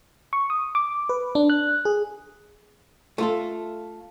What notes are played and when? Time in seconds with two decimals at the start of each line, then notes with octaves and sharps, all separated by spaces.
0.33 C#6
0.50 D#6
0.75 D6
1.09 B4
1.35 D4
1.50 F#6
1.85 G#4
3.18 A3 F4 A4